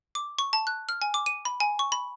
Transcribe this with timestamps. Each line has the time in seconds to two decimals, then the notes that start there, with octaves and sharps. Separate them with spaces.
0.15 D6
0.39 C#6
0.53 A5
0.67 F#6
0.89 F6
1.02 G#5
1.14 D6
1.26 D#7
1.45 B5
1.60 G#5
1.79 C#6
1.92 B5